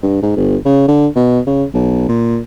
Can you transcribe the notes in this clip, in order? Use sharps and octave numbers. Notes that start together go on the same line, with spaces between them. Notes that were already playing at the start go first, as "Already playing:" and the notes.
G2
G#2
G1
C#3
D3
B2
C#3
B1
A#2